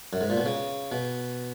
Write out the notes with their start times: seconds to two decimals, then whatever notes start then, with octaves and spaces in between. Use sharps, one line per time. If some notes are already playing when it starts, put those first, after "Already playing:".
0.13 F#2
0.21 G#2
0.30 A#2
0.37 B2
0.46 C#3
0.92 B2